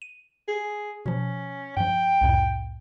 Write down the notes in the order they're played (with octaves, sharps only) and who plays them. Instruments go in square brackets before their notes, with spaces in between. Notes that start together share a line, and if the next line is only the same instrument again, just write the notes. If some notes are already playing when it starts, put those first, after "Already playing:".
[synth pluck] D#7
[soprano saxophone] G#4
[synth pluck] B2 F3 [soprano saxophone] C#4
[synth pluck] G2 F3 [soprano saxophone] G5
[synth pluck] C2 F2 A2